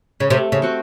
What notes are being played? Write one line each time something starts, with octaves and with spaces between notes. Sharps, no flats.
C#3
C3 A3
C#3
C4 F#4